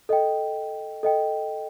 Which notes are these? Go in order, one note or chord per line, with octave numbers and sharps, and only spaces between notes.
A4 D#5 G5
A4 D#5 G5